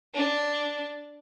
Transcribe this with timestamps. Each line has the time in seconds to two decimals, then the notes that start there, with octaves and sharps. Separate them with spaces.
0.14 D4